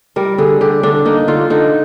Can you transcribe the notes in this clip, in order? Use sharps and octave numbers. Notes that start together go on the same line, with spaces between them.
G3 A#4
D3 G#4
D3 G4
D3 D4
A#3 D#4
D3 F4
D3 D#4